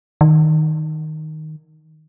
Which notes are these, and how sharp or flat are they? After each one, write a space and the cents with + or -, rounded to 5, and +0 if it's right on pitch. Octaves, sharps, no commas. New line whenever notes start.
D#3 +0